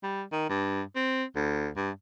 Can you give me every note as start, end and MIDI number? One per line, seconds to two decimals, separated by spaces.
0.03 0.24 55
0.32 0.46 51
0.50 0.82 43
0.96 1.24 60
1.36 1.70 38
1.77 1.90 43